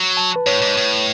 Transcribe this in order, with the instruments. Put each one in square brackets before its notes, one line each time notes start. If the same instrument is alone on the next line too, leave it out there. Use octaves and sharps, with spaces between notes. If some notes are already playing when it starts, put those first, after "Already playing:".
Already playing: [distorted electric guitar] F#3
[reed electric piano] A5
B4
[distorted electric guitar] A2 [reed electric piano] C#5
[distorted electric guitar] G#2
A2